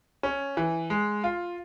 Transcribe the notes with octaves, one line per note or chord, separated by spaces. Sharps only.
C#4
E3
G#3
F4